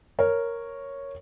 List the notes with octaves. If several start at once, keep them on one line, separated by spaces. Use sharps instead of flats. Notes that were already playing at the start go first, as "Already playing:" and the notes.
A#4 C#5